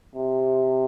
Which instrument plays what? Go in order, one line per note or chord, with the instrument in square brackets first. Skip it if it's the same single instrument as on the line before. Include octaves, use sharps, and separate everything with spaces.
[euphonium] C3